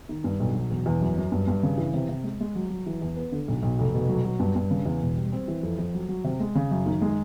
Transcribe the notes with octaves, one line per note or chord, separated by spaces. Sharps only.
D#3
G2
B1
F#3
E1
E2
F#2
F#2
G2
G2
C#3
E3
C3
C3
G#3
G#3
F#3
F#3
E3
E2
B3
D3
B1
B1
F1
B2
F#3
F#3
G2
G2
C#3
E2
E1
G3
C4
E3
F2
F2
F#3
F#3
C3
G#3
C#3
F#2
D#3
G#3